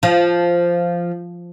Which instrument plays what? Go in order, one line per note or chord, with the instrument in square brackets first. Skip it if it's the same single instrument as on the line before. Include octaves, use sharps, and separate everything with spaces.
[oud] F3